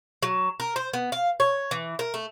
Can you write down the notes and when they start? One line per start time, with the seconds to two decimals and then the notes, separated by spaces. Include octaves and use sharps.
0.23 F#3
0.60 A#4
0.76 C5
0.93 B3
1.12 F5
1.40 C#5
1.71 E3
1.99 A#4
2.14 A3